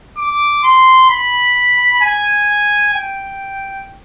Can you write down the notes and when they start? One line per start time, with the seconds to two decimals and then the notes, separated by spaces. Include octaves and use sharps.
0.18 D6
0.63 C6
1.09 B5
2.02 G#5
2.94 G5